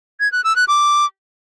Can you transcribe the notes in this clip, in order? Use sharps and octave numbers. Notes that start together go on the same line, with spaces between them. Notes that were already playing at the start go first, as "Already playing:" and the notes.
G#6
F#6
E6
F#6
D6